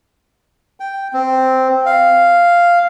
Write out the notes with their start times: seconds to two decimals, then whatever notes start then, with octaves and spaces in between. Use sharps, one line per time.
0.80 G5
1.13 C4
1.86 F5